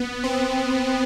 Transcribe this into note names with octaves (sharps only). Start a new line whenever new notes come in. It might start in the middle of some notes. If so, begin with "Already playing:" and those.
Already playing: B3
C4